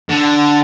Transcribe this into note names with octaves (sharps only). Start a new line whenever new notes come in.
D3